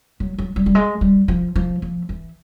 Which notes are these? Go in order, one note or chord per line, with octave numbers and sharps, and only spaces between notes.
F#3
F#3
G3
G3
G#3
G3
F3
F3
F3
E3